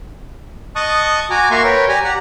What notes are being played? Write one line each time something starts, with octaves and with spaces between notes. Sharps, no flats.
D#5 A5 C#6 D#6 F#6
F#4 G#5 A#5 D6
A#3 F#4 E5 A#5 C6 C#6
A#4 B4 C#5 G5
G4 D5 G#5 A#5
G4 F#5 A#5